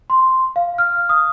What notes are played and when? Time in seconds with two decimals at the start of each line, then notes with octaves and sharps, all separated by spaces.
0.10 C6
0.56 F5
0.78 F6
1.09 D#6